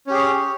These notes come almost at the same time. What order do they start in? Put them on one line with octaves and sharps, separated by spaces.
C#4 G4 G#4 C#5